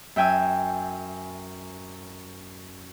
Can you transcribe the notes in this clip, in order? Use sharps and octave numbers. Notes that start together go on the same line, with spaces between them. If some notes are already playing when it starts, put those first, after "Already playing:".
F#2 E5 G5 G#5 E6